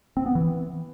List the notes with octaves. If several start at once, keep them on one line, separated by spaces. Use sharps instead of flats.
C4
B3
E3